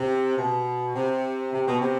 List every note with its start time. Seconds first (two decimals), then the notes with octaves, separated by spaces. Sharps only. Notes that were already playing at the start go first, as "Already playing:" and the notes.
Already playing: C3
0.38 B2
0.95 C3
1.53 C3
1.67 B2
1.81 C3